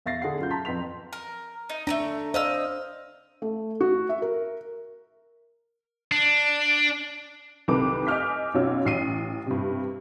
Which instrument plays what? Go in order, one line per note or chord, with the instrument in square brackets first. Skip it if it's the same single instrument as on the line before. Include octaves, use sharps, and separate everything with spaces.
[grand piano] E2 E5 F5 A6 A#6 C7
D3 G#4 E5 F#5 C7
F#2 F4 G6
A5 A#5 C6 B6
F2 B4 C6 B6 F7
[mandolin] A#4
D#4
[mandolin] A3 C4 A#5 [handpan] D4
[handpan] C5 D5 [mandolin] D#5 F5 E6
[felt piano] A3
F#4
E5
A#4
[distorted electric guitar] D4
[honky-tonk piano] C2 D#3 A4 B4 D6
D#5 G#5 D6 F6 G6 B6
B1 F#2 F4 F#4 C#5 E6
A1 C7 D#7
G2 C3